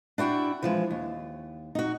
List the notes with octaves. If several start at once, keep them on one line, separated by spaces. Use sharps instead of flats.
D4 E4 F#4 G5
E3 F3 G#3
D#2
D#4 F#4